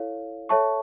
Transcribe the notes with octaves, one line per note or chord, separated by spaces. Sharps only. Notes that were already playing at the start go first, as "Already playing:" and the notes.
Already playing: E4 A4 C#5 F5
A4 C#5 E5 A5 C#6